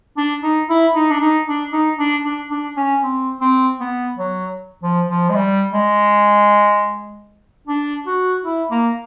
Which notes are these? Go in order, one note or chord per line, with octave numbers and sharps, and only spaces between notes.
D4
D#4
E4
D#4
D4
D#4
D4
D#4
D4
D4
D4
C#4
C4
C4
B3
F#3
F3
F3
G#3
G3
G#3
D4
F#4
E4
A#3